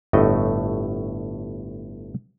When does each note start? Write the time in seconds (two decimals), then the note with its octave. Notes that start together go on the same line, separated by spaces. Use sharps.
0.13 G1 A2 A3 D#5